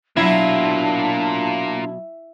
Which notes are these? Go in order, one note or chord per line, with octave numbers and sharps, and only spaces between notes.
B2 F#3 A#3 D4 E4 F4